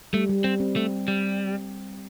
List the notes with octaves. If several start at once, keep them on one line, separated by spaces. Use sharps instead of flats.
G3 A3
G3
G3 C4
C4
A3
G3